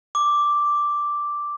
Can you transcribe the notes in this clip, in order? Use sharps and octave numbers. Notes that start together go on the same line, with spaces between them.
D6